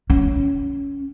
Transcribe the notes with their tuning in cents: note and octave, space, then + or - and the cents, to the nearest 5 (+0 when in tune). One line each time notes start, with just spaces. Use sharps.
C#4 +15